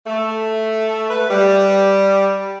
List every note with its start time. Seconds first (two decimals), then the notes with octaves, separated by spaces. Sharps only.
0.07 A3
1.11 B4
1.30 G3